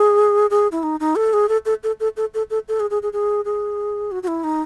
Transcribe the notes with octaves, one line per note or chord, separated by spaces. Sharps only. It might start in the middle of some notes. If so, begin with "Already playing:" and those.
Already playing: G#4
G#4
E4
D#4
D#4
A4
G#4
A4
A4
A4
A4
A4
A4
A4
A4
G#4
G#4
G#4
G#4
G#4
F#4
F#4
E4
D#4